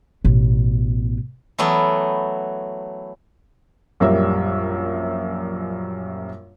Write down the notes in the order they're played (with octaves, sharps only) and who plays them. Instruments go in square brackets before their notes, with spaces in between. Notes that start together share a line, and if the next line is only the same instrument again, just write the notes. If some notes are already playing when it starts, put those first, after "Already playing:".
[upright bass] A1 B2
[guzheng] E3 F#3 A3 B3
[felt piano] A#1 F#2 G3 A#4 C#5 E5